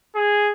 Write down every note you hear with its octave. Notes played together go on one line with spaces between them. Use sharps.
G#4